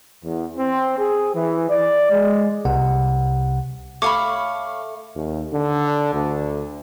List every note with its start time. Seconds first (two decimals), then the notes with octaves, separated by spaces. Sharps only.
0.23 E2
0.57 C4
0.98 G#4
1.34 E3
1.70 D5
2.11 G#3
2.65 C2 C3 F#5
4.02 A3 C#5 F5 B5 D6
5.15 D#2
5.53 D3
6.14 D2